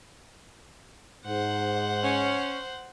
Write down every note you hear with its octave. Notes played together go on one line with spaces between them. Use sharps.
G#2 C5 F#5
C#4